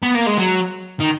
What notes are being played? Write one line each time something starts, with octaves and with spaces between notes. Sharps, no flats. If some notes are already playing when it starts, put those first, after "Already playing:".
B3
A#3
G#3
F#3
D#3